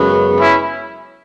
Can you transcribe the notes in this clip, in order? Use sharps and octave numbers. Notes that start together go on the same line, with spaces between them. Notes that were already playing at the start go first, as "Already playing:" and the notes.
Already playing: F#2 C#3 G#3 B3
C#4 E4